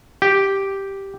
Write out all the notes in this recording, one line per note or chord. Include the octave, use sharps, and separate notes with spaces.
G4